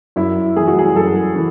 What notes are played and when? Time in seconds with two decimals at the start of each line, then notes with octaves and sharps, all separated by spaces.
0.16 F#2 E4
0.56 E3 A3 G#4
0.67 F#4
0.79 G#4
0.96 F#2 A4
1.35 E3